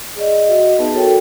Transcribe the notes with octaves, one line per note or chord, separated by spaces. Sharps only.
G#4 D5 D#5
F#4 D#5 E5 F#5
B3 D#4 G#4 B4 A5
F#4 A4 A#4 C#5 E5 G5